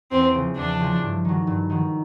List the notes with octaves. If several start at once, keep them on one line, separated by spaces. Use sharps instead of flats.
E2 C4
C#3 F3
E2 D4
C#3 F3
G2
D#3 F#3
G2
D#3 F#3